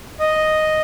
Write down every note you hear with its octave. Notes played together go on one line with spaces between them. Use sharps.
D#5